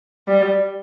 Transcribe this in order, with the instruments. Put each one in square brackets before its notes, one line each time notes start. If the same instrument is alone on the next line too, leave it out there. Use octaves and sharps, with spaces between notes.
[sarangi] G3